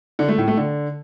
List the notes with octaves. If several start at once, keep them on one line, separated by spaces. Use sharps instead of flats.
D3
A3
A2
A3
D3